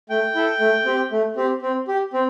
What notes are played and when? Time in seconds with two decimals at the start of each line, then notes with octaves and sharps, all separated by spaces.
0.10 A3 G5
0.36 E4 A4
0.60 A3
0.86 C4 G4
1.12 A3
1.36 C4 G4
1.62 C4
1.88 G4
2.14 C4